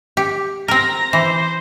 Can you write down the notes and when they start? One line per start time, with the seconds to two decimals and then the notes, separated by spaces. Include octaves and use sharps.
0.17 G4
0.68 C4 A#4 A#5 A#6
1.13 E3 C5